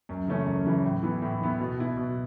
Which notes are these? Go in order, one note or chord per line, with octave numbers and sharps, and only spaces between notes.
F#2
C#3 E3 A3 C#4
F#2
C#3 E3 A3 C#4
A2
E3 B3 E4
A2
E3 B3 E4
B2
B3 E4
B2